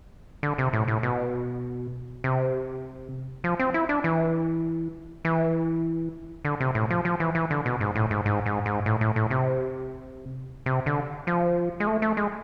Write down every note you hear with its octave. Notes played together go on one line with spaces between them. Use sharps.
D3
C3
A2
A2
B2
C3
F3
C4
E4
D4
E3
E3
D3
C3
A2
F3
F3
E3
E3
D3
B2
G#2
A2
G#2
G#2
G#2
G#2
A2
A2
A2
C3
C3
D3
F3
G#3
A3
A3
G#3